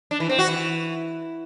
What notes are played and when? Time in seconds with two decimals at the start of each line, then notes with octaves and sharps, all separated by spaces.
0.11 D4
0.20 E3
0.29 C4
0.39 F#4
0.48 E3